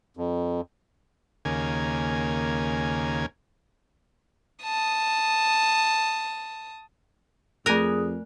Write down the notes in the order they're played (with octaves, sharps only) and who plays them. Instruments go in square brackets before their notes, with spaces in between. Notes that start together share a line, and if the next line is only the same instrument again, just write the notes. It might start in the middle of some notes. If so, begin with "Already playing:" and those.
[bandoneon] F2
[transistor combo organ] D#2 C#3 A#3 G#5
[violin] A5 D#6
[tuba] F2 [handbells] A3 F#6 [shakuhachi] G#4 [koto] A#4 G#5